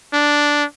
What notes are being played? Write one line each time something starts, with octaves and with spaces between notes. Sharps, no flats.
D4